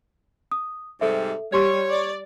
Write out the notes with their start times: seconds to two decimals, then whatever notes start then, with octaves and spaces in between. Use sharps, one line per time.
0.52 D#6
1.01 G#2 C3 G3 A4 E5
1.53 G3 G4 C#5 C6 C#6
1.89 D5